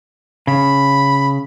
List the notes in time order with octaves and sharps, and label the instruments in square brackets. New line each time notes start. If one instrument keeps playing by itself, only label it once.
[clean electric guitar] C#3 [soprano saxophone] B5